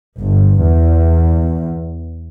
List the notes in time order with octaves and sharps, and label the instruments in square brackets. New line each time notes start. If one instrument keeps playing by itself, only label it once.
[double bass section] G1
E2